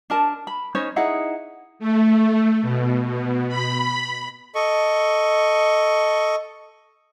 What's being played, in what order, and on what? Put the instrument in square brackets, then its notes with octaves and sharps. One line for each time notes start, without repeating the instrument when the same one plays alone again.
[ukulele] D4 A#4 A5
B5
C#4 D#4 C5 C#5
D#4 E4 G#4 F#5
[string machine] A3
B2
B2
B5
[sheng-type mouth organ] A4 D#5 C#6